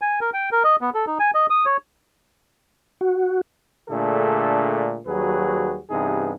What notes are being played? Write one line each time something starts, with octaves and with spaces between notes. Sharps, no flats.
G#5
A#4
G5
A#4
D#5
B3
A4
D#4
G#5
D#5
D#6
C#5
F#4
A#2 D3 A3 D4 G#4 A4
D#2 F#3 G3 F#4 G#4 B4
G2 C3 E3 B3 D#4 G#4